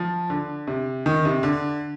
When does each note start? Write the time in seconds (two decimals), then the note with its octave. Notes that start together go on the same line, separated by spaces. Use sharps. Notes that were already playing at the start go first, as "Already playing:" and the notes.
Already playing: F3
0.30 D3
0.67 C3
1.06 D#3
1.25 C3
1.43 D3